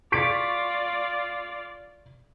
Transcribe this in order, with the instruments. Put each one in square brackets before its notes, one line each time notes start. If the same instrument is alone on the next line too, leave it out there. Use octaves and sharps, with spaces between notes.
[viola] F4 D5 [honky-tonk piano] C#6 B6 D7